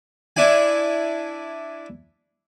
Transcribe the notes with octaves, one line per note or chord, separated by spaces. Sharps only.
D4 E4 G#5